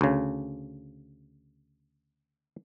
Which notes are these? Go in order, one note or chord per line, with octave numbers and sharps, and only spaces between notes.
D2 C#3